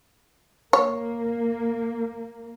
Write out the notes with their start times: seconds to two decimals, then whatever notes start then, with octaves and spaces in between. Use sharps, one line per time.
0.73 A#3 C#5